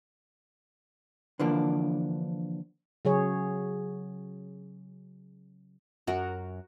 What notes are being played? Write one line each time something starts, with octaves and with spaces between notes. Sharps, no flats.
D3 E3 F3 A#3 D4
C#3 F#3 G#4 C#5
F#2 F#4 A#4